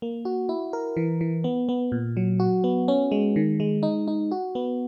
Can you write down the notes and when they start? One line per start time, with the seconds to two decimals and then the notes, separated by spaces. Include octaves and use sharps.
0.02 A#3
0.25 F#4
0.49 E4
0.73 A#4
0.97 E3
1.21 E3
1.44 B3
1.69 B3
1.92 A#2
2.17 F#3
2.40 F#4
2.64 B3
2.88 C#4
3.12 G#3
3.36 D#3
3.60 G#3
3.83 D#4
4.08 D#4
4.31 F#4
4.55 B3